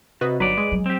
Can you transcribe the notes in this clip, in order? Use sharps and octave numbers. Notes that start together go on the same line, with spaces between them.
C3 F#4 B4 D#5
G1 F#3 D#4 B4 D5
G#3
F#3
C4 G4